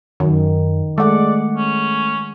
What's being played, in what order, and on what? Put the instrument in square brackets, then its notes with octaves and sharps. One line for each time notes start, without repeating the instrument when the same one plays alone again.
[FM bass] F#2 [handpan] D#3
[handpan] G#3 F#5 [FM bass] A3 [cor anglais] D5
[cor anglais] C#4